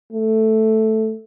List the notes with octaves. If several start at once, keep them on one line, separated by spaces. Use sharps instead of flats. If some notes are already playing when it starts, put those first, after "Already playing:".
A3